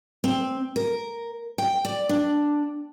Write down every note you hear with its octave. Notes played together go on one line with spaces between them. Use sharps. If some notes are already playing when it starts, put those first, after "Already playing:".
C4
A#4
G5
D5
D4